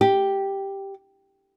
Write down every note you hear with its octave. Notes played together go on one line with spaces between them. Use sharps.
G4